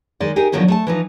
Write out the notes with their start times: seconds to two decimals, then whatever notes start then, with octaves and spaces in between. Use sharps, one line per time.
0.20 D#3 G#3 D5
0.36 D#4 G4 G#4 A#4
0.52 D3 D#3 F3 F#3 A#3 B3
0.68 A3 D5 A5
0.87 E3 F3 D#4